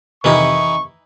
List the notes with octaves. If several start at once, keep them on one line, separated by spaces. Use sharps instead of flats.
F2 C3 D#3 E3 D#4 E4 C#6